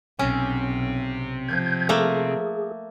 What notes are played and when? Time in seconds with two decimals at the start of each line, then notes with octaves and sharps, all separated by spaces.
0.19 B1 C3 C#4
1.48 F3 G6 G#6
1.89 A3 A#3 G#4